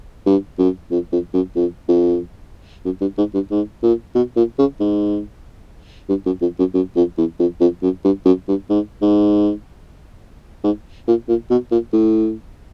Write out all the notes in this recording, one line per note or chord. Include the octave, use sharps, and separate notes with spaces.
G2
F#2
F2
F2
F#2
F2
F2
F#2
G2
G#2
G2
G#2
A#2
B2
A#2
C#3
G#2
G2
F#2
F2
F#2
F#2
F2
E2
F2
F2
F#2
G2
F#2
G2
G#2
G#2
G#2
A#2
A#2
B2
A#2
A2